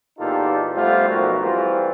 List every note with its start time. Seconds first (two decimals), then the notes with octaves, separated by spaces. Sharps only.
0.19 E2 A#2 D#4 F4 G4 A4
0.74 G3 A3 B3 F4 C5
1.08 B1 F3 B3 F#4 A#4
1.40 E3 G3 A3 C4 F4